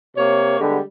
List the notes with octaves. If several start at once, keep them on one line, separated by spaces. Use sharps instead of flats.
C3 A#3 C#5
D3 G3 G#3 B3 G4